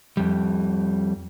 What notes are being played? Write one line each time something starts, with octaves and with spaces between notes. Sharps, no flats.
F2 G3